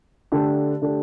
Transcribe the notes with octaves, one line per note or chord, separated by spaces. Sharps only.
D3 A3 D4 G4
D3 A3 D4 G4